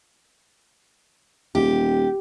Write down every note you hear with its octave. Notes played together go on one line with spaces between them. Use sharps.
D#1 G4